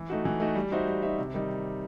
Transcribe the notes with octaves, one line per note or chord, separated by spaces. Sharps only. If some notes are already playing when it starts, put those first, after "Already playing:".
Already playing: E3
A3 D#4 F#4
E3
A3 D#4 F#4
G3
D#4 F#4 C5 E5
G3
D#4 F#4 C5 E5
C3
D#3 G3 D#4